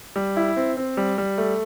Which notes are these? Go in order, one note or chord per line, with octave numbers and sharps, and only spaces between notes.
G3
E4
C4
C4
G3
G3
A3